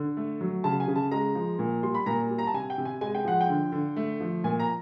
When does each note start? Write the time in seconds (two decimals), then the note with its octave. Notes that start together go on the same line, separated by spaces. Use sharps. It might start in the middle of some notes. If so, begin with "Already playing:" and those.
Already playing: D3
0.17 A3
0.41 F#3
0.64 C#3 A5
0.80 G#5
0.88 C#3
0.96 A5
1.11 G#3 A#5
1.35 F3
1.59 A#2
1.83 G3 C6
1.95 B5
2.06 A#2 A#5
2.30 G3
2.38 A#5
2.47 A5
2.54 C3 G#5
2.70 G5
2.78 C3
2.85 G#5
3.01 G#3 G#5
3.15 G5
3.25 F3 F#5
3.41 G5
3.49 D3
3.72 D3
3.96 A3
4.20 F3
4.44 A#2 G#5
4.59 A#5